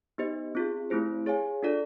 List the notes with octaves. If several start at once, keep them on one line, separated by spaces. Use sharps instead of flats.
B3 D#4 G4 C5 D#5
C4 F4 G#4
A3 C4 E4 G4 C5
G#4 C#5 F5 G#5
D4 F4 A4 D5